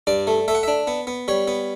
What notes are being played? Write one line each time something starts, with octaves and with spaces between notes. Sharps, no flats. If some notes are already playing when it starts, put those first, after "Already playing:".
G2 D5
A3
A3 E5
F#5
D4 E5
B3
B3
G3 C#5
B3